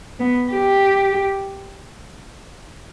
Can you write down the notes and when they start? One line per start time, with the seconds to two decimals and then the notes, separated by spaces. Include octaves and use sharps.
0.20 B3
0.52 G4